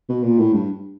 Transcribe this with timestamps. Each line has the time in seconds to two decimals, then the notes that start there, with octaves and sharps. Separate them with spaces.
0.09 B2
0.23 A#2
0.38 A2
0.54 G2